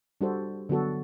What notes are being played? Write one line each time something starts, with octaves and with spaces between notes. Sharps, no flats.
G3 D4 F#4 A4 C5
D3 F#3 B3 F#4 A4